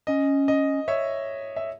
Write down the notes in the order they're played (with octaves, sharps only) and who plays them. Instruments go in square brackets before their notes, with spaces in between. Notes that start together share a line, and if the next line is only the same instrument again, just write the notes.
[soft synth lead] C#4 [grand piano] D#5
[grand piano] D#5
C#5 E5
E5